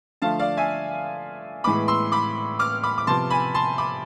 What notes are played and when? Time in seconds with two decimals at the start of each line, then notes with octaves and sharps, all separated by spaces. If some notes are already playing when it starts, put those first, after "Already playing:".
0.22 D3 F3 A3 F5 A5
0.39 D5 F5
0.57 E5 G#5
1.64 A2 E3 G#3 B3 B5 D6
1.88 C6 E6
2.12 B5 D6
2.59 D6 F6
2.83 B5 D6
2.98 D6
3.07 C3 F3 B3 A5 C6
3.30 G#5 B5
3.54 A5 C6
3.78 B5 D6